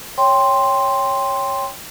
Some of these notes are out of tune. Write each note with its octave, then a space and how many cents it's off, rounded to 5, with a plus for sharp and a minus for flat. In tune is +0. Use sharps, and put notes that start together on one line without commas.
C#5 +0 G5 +15 C6 +0